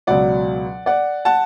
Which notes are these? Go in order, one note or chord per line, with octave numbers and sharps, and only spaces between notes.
C#2 B2 F#3 D5 F#5
D5 F#5
F#5 A5